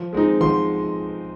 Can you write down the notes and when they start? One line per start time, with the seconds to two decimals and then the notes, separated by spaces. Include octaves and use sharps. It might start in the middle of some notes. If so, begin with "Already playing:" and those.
Already playing: F3
0.13 G#3 C4 D#4
0.41 F3 C6